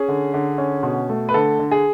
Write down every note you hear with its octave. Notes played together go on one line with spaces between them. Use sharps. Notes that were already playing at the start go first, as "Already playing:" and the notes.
Already playing: C#4 G#4
D3
D3
C#4
B2
A3
B4
D3 A4
D3
G#4